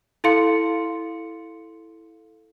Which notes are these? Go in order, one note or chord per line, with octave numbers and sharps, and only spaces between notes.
E4 A4 F5 C6 C#7